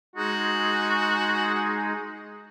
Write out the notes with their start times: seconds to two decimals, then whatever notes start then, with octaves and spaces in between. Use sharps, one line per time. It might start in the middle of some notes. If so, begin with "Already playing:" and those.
0.16 G#3 D#4 F#4 G#4